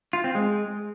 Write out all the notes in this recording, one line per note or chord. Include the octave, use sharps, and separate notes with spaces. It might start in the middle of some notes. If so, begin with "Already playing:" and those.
F4
C4
G#3